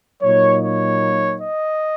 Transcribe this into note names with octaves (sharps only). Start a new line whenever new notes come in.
A#2 F#3 A#3 D#4 C#5
C#5
D#5